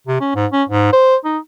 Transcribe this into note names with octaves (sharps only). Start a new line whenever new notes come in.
C3
C#4
G#2
C#4
G#2
C5
D#4